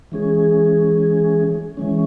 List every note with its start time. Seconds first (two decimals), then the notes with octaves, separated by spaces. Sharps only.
0.12 E3 G#3 C#4 G#4
1.77 E3 G#3 C#4